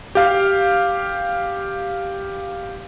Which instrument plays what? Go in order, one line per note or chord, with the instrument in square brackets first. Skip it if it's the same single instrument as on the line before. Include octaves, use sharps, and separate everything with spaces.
[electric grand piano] G4 F5